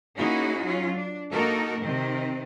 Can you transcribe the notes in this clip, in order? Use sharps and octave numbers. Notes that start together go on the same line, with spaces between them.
A#3 C#4 D#4 E4 F#4 G#4
F#3 C#4 F4
D4
A#3 D#4 F#4 A4 A#4
C3 D#3 C4